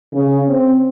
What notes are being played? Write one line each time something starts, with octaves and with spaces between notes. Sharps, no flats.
C#3
C4